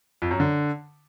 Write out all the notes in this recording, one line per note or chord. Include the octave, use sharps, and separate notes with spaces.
F2
F#2
D3